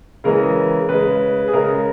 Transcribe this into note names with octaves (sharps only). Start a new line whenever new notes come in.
C#3 E3 G#3 A#4
C#3 G#3 B4
G#4
C#3 G#3 A#4